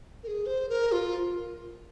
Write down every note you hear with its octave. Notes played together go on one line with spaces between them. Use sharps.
A#4
G#4
C5
A#4
F4